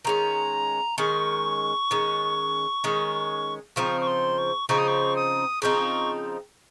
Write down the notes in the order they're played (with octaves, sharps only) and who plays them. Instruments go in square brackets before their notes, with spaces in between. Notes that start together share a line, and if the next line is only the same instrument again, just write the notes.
[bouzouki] D#3 G#3 C#4 [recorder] A#5
[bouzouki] D#3 G#3 C#4 [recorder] C#6
[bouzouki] D#3 G#3 C#4
D#3 G#3 C#4
[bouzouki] C#3 F3 C4 D#4 [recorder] C#6
[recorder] C#6
C6
C#6
[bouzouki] C#3 F3 C4 D#4 [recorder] C#6
[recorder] D#6
C#6
D#6
[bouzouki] C#3 F3 C4 D#4 [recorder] C#6